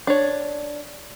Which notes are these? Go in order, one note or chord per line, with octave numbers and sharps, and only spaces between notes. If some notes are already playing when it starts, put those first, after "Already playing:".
D4 C#5